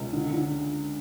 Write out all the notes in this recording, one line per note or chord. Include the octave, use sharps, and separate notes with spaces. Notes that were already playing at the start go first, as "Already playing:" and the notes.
Already playing: C#2
D3
D3